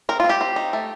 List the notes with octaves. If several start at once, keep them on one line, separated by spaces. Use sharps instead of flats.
C4 A#4
F4
C4
G4
C4
D#4
A3